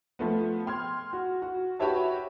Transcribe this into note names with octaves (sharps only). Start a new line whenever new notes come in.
F3 A3 B3
G5 C6 F6 G#6
F#4
F#4
F#4 G4 B4 C#5 E5 A5